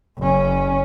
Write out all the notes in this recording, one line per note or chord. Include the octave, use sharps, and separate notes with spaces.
F#1 C#4